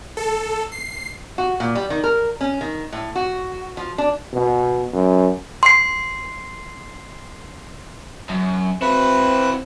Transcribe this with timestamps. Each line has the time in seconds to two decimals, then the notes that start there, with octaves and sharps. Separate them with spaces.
0.17 A4
0.72 C7
1.38 F#4
1.60 A#2
1.75 G3
1.90 D#3
2.04 A#4
2.41 C#4
2.61 D#3
2.93 A2
3.15 F#4
3.77 F3
3.98 D4
4.33 B2
4.93 F#2
5.63 C6 C7
8.29 F#2
8.82 C4 E4 F#4 B4